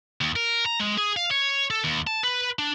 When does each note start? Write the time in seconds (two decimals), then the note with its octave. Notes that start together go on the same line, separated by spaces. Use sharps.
0.21 D#2
0.36 A#4
0.66 A#5
0.80 G#3
0.98 G#4
1.17 F5
1.31 C#5
1.71 A4
1.84 D#2
2.07 A5
2.24 B4
2.59 D4